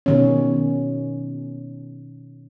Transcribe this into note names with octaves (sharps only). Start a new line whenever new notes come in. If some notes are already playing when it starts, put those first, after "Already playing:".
B2 D#3 C#4